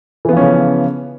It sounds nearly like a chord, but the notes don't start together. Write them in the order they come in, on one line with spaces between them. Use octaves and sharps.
E3 B3 F3 C#4 C#3